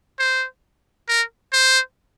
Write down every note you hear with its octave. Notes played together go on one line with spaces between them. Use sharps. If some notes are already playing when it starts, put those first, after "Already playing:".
C5
A#4
C5